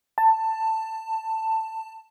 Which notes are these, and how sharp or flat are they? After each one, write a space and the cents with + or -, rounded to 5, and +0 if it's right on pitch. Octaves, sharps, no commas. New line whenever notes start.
A5 +15